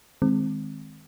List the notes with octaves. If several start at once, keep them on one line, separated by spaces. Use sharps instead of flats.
D#3 G#3 C4